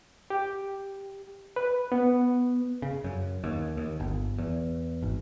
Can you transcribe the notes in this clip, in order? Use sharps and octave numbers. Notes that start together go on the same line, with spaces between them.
G4
B4
B3
C#3
F#2
D#2
D#2
G1
E2
G#1